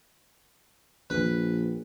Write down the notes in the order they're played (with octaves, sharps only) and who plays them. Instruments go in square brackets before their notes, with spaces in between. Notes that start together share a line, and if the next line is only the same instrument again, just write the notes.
[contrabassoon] A#1 [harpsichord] B4